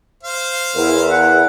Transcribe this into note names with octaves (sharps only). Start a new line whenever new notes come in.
C5 F5
E2 E4 A#4
F#5